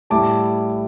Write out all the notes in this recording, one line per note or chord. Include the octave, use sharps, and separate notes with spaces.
A2 G3 E4 A5 D6